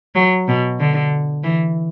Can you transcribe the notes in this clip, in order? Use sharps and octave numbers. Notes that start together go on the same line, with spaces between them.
F#3
B2
D3
E3